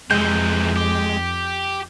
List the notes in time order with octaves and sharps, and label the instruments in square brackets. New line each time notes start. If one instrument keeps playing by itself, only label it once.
[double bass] F2 [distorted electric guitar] C3 E3 [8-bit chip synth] G#3 [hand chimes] G6
[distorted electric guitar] G4